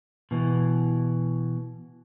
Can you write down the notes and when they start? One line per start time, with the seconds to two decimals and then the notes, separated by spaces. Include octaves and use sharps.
0.31 B2 E3